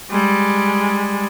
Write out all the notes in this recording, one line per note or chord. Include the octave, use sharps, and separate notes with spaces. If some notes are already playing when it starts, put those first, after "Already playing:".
G3 G#3